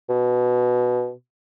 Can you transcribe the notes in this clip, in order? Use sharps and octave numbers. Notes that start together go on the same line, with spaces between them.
B2